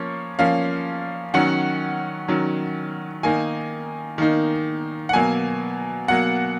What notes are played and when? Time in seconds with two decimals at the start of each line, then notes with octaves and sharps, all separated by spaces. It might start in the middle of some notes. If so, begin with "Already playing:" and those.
Already playing: F3 A#3 C#4 C#5
0.39 F3 A#3 C#4 F5
1.34 D#3 F#3 C#4 F#5
2.28 D#3 F#3 C#4
3.23 D#3 A#3 D#4 G#5
4.18 D#3 A#3 D#4
5.09 F#5
5.13 B2 F#3 A#3 G#5
6.08 B2 F#3 A#3 F#5